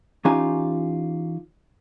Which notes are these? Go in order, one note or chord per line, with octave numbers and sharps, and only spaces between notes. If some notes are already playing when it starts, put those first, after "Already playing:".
E3 C#4 D#4 F4 G4 G#5